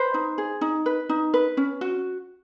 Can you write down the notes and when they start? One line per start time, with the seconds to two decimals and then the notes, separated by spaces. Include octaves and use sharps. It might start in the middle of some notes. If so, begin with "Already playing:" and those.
Already playing: B4 C5
0.14 D#4
0.38 G#4
0.61 D#4
0.86 B4
1.09 D#4
1.34 B4
1.57 C#4
1.81 F#4